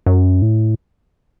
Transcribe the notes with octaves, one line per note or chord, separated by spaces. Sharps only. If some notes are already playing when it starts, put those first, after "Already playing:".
F#2
A2